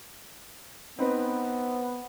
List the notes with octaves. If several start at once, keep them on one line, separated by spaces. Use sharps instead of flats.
B3 C4 D#4 B4